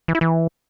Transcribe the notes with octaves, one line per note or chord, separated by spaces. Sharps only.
E3
E4
E3